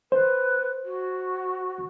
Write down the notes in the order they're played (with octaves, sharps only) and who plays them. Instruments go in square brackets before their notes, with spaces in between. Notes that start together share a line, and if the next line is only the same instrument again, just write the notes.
[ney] B4 [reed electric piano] C5
[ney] F#4